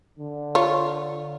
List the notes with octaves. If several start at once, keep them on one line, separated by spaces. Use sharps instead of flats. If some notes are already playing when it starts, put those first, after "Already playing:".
D3
F4 C#5